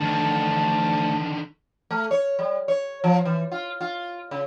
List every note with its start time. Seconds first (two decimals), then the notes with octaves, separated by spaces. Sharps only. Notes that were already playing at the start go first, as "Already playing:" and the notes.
0.01 D2 D3 D#3 A5
1.91 A3
2.11 C#5
2.39 G3
2.68 C#5
3.04 F3
3.26 E3
3.52 F4
3.81 F4
4.31 C#3